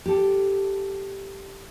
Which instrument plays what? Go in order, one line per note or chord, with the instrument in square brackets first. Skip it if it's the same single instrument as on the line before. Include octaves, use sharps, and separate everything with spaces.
[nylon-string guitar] G4 A4